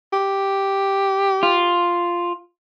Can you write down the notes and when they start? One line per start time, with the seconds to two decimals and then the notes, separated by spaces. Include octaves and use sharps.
0.13 G4
1.43 F4